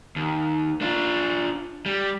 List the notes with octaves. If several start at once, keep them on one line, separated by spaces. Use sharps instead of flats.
D#2
D4 F4
G3